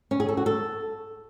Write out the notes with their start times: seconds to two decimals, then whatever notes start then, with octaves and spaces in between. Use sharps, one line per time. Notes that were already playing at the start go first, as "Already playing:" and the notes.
0.11 C#4
0.20 G#4
0.29 A4
0.37 F#4
0.46 A4